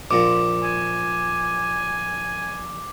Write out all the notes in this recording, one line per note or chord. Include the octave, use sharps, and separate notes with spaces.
A#1 A#2 D6
G#5